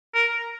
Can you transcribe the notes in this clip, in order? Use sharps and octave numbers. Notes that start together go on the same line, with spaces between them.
A#4